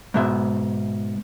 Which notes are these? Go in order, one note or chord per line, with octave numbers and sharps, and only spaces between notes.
G#2 B2 E5